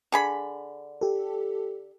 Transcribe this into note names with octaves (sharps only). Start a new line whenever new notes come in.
D3 G#4 B5
G4 A4